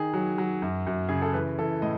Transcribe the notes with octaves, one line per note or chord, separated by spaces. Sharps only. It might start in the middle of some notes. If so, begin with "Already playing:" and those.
Already playing: D#3 G#4
F#3
F#3
F#2
F#2
C#3 G#4
A4
E3 B4
E3 A4
A2 D#5